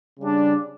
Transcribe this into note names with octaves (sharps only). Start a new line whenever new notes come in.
C#3 G3 D4